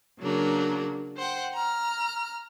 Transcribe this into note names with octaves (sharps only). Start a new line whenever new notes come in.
C#3 F#3 A#3 D4
C5 F#5 G5
A#5 F6